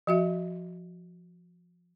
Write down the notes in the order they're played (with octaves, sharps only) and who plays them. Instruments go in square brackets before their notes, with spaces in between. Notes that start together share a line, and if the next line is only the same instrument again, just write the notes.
[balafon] F3 F#4 E5